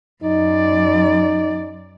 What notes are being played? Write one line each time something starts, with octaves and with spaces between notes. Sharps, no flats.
F#2 D#4 D5